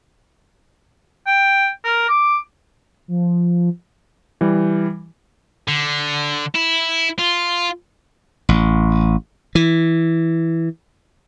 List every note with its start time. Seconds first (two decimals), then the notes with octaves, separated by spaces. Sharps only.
1.27 G5
1.84 A#4
2.09 D6
3.08 F3
4.41 E3 G3
5.68 D3
6.55 E4
7.19 F4
8.49 A1
9.55 E3